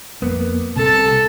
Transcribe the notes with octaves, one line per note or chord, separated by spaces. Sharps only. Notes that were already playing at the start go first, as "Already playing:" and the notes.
F2 A#3 B3
C2 C3 A4 A5